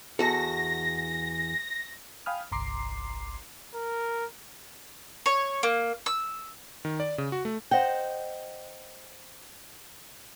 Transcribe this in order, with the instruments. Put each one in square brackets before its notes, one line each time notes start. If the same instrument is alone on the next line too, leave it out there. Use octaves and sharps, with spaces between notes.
[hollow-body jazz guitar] E2 F#4 A4 [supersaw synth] A#6
[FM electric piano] F5 G5 G#5 B5 D#6 F6
G1 C2 A#5 C6 D6 C7
[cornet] A#4
[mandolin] C#5
A#3
E6
[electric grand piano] D#3
D5
C#3
F#4
A3
[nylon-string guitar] C5 D#5 F#5 G5